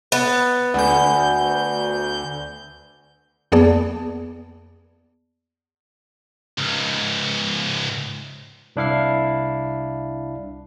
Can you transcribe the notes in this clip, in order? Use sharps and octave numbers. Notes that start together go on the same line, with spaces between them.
B3 A6
D2 D5 F#5 G#5 B5 G6
F2 A#3 B3 G#4 D5 A5
C#2 G#2
C2 D4 E4 F5 C7